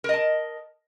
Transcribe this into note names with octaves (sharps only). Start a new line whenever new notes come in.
A#4 D#5 A5